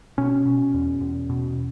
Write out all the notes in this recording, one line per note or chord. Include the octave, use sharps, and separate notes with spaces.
B2 C#4
B2
E2
E2
B2